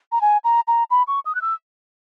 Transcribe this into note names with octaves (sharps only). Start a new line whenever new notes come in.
A#5
G#5
A#5
A#5
B5
C#6
D#6
F#6
E6